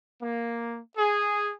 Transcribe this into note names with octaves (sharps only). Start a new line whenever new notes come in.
A#3
G#4